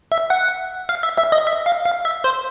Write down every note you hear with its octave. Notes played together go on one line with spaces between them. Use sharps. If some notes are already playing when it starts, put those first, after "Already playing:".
E5
F#5
F5
E5
E5
D#5
E5
F5
F5
E5
C5